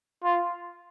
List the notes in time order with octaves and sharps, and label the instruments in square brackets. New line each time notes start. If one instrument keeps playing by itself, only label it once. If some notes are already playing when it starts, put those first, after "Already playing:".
[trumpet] F4